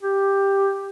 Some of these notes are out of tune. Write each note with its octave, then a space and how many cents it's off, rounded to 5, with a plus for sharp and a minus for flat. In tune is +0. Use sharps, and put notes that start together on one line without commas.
G4 +5